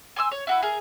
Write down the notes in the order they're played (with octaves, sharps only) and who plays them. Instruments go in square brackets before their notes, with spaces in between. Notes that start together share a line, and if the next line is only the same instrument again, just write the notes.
[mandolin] G#5 C6 D#6 E6
C#5
E4 F#4 B4
G#4 A#4